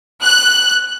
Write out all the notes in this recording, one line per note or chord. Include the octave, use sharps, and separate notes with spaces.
F#6